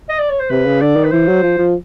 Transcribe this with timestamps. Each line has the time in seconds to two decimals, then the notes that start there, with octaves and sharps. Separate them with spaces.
0.09 D#5
0.19 D5
0.30 C#5
0.39 C5
0.50 C3 B4
0.66 C#3
0.81 D3 D5
0.96 D#3
1.04 B4
1.12 E3 C5
1.28 F#3
1.43 F3
1.58 F3